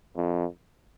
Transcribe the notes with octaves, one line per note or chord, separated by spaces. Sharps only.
F2